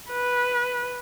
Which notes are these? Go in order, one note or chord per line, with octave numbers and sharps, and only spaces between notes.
B4